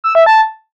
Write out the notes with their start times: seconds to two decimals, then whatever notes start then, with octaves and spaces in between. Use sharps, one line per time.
0.04 E6
0.15 E5
0.26 A5